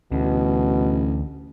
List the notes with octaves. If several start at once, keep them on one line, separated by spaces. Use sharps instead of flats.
A1 D2 B2